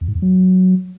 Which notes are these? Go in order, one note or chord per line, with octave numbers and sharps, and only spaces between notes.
E2
G#2
E2
F#3